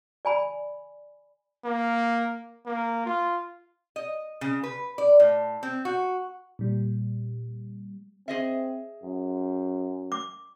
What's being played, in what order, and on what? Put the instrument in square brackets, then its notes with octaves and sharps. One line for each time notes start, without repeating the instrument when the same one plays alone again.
[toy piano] D5 G#5 B5
[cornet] A#3
A#3
F4
[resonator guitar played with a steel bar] D#5
C#3
B4
D5
A2
C4
F#4
[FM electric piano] A#2 G3
[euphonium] C4 [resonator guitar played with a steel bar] G#4 D#5 E5
[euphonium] F#2
[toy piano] D6